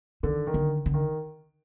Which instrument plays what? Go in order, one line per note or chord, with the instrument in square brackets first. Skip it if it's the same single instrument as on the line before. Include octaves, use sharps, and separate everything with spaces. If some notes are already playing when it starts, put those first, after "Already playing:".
[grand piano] D3 [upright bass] D#3
[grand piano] D#3
[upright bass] D3
D3
[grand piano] D#3